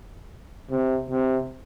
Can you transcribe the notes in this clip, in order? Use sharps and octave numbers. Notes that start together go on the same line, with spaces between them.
C3
C3